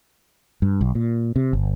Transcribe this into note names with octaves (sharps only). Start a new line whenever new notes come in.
G2
B1
A#2
C3
G1